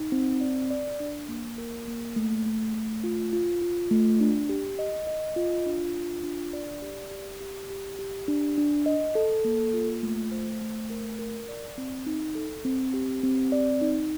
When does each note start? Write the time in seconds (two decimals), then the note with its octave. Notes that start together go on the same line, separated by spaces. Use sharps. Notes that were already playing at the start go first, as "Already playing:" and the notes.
Already playing: D#4
0.12 C4
0.41 D5
0.70 D5
1.00 D4
1.29 A#3
1.58 A#4
1.87 A#3
2.16 A3
2.46 A3
2.74 A3
3.04 F4
3.33 F4
3.62 F4
3.91 A3
4.20 D4
4.49 G4
4.79 D#5
5.07 D#5
5.36 F4
5.66 D4
5.94 F4
6.23 D4
6.53 D5
6.82 G4
7.11 G4
7.40 G4
7.70 G4
7.99 G4
8.28 D4
8.58 D4
8.86 D#5
9.15 A4
9.45 A#3
9.74 F4
10.03 A3
10.31 C5
10.61 A3
10.90 A#4
11.19 A#4
11.49 D5
11.78 C4
12.06 D#4
12.35 A4
12.65 C4
12.94 G4
13.23 C4
13.52 D5
13.82 D#4